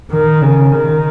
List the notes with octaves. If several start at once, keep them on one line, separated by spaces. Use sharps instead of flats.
D#3
C#3
D#3